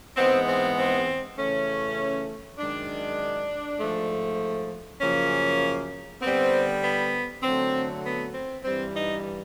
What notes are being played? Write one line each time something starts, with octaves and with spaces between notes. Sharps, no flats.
G#2 E3 G#3 B3 C4
C4
C4
C#3 E3 A3 C#4
F#2 D#3 G#3 D4
G#2 F3 A3
F#2 C#3 F3 A#3 C#4
D3 G3 B3 C4
B3
D3 F#3 A3 C4
B3
C4
G2 E3 G3 C4
D#4